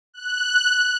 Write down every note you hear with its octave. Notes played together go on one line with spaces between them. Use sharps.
F#6